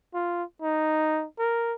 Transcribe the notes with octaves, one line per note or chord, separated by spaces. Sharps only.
F4
D#4
A#4